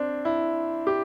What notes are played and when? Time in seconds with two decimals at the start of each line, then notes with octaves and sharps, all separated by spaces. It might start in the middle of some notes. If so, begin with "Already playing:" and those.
Already playing: C4 D4
0.25 E4
0.87 G4